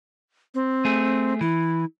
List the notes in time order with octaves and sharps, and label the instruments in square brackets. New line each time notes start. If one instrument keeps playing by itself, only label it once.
[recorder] C4
[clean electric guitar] A3 G#4
[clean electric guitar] E3 [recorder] E4